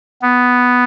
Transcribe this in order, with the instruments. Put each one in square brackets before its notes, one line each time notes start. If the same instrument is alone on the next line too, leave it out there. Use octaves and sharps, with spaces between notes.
[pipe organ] B3